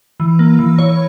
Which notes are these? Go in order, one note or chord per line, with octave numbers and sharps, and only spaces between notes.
E3
A#3
E3
E3 C#5